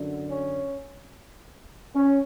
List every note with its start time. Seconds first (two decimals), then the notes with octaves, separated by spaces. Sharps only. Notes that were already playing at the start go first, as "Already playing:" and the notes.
Already playing: F#2 D3
0.29 C#4
1.94 C#4